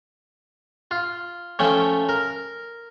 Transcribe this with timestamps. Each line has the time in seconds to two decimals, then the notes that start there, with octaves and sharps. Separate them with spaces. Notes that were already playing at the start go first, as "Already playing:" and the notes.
0.91 F4
1.59 F3 A3 C#4 G5
2.09 A#4